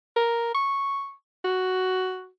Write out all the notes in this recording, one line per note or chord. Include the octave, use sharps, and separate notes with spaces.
A#4
C#6
F#4